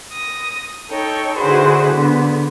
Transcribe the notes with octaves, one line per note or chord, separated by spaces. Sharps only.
D#6 A#6
D#4 A4 C#5 G5
D3 E4 F#4 G#4 B4 C5
D3 B3